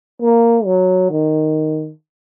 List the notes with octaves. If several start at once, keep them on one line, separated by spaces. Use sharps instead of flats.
A#3
F#3
D#3